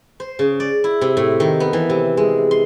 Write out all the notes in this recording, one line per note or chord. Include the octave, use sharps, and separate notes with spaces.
C5
C#3
D5
E4
C3
A2
D#3
B3
E3
C3
G#3
C6